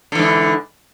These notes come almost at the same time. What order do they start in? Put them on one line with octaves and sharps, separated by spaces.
D3 E3 G#2